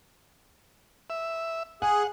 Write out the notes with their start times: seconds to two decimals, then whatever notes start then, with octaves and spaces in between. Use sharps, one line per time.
1.10 E5
1.82 G#4 F#5 G#5